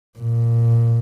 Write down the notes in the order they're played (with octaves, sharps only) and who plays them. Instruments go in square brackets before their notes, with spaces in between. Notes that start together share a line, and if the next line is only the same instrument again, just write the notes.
[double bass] A#2